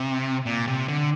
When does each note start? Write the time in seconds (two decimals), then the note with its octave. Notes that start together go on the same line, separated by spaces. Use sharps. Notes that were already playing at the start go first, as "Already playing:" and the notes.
Already playing: C3
0.46 A#2
0.67 C3
0.88 D3